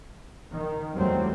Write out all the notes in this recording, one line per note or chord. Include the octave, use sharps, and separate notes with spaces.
D#3
E2 F#3 G3 A3 C4